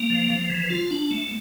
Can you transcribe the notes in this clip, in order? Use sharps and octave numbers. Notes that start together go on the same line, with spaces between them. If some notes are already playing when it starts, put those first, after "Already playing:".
Already playing: A#3
F3
F3
E3
F4
D4
A3